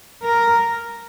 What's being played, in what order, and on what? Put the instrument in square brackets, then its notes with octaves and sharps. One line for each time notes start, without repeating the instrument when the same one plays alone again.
[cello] A#4